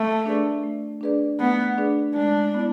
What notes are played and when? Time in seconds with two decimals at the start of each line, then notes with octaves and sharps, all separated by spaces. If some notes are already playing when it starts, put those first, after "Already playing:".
Already playing: A3
0.25 D4 G#4 B4 D5
0.64 A3
1.01 D4 G#4 B4 D5
1.40 A3 B3
1.77 D4 G#4 B4 D5
2.15 G#3 D4
2.54 B3 E4